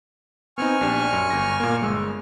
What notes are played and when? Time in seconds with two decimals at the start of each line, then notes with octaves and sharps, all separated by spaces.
0.58 B3 C4 D#4 G#5 C#6 F6
0.81 A#1 D4 G4
1.13 F#2
1.30 G1 A#6
1.60 A#2 A#3
1.81 G1 G#3 E6